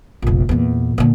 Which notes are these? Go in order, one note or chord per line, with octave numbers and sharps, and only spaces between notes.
F1 A#1
E2 A#2
A#2 D3